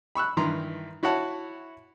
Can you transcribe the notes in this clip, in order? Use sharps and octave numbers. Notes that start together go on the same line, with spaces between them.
B5 C#6 E6 F#6
G2 D#3 E3 A#5 C6
E4 F#4 C#5 F#5 A5